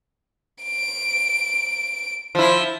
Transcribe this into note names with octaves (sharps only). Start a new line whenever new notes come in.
D7
F3 E4